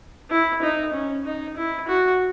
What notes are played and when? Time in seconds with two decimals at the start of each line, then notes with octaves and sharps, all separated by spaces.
0.30 E4
0.62 D#4
0.93 C#4
1.25 D#4
1.56 E4
1.88 F#4